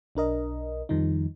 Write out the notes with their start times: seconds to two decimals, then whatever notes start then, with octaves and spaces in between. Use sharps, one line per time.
0.15 B1 D4 A#4 D#5
0.89 F2 D#3 F3 G3 D#4